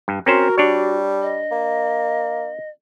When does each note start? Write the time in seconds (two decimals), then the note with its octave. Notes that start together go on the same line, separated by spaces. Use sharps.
0.08 G2
0.26 C4 C#4 F#4 A#4 C5
0.58 G3 D4 C#5
1.22 D#5
1.51 A#3